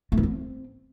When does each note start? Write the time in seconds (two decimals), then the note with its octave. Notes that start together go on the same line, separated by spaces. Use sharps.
0.12 A3
0.18 E3
0.23 C4